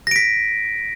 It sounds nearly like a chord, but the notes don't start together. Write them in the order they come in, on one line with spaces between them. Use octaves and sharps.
A#6 D7 B6